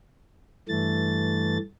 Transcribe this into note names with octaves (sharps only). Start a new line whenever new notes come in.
G2 E3 A3 A6